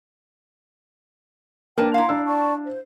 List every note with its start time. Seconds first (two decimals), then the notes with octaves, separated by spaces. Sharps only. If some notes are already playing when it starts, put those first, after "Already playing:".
1.78 A#3 D4 G#4 A#4 B4 G5 A5
1.94 E4 F5 F#5 A#5 C6
2.09 D4 D5 A#5 E6
2.26 D5 A5 C#6
2.65 C5